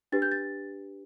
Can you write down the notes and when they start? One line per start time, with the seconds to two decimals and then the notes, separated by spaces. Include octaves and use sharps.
0.12 D4 G4 B4 A6
0.22 G6
0.32 A6